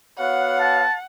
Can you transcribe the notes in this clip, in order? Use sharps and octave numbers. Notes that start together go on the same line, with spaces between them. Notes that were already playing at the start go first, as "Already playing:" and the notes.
B3 F#4 C#5 F5 F#5
A5